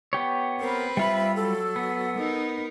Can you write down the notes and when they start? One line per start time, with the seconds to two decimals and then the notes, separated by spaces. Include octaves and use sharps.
0.13 B3 G4 C#5
0.60 C4 A#4 B4
0.97 G3 F4 E5 B5
1.36 F#3 A4
1.76 B3
2.18 D#4 A#4